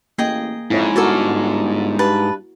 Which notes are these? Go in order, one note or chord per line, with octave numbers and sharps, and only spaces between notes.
A1 A#3 G#4 D#5 G5
F2 G#2 E4 C#5
G1 F#4 A4 A#4 C#5 D5
G2 B4 A5